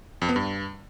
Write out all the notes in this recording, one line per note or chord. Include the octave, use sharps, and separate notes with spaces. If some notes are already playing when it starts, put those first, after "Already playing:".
F2
B3
G2